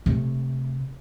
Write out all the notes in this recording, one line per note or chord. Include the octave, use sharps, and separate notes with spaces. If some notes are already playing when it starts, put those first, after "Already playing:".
C3 A3